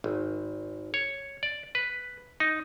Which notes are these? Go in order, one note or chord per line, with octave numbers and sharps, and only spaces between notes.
G#1
C#5
D5
B4
D#4